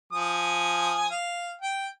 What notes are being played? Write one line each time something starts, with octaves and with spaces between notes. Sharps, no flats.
F3 G#5 D#6
F5
G5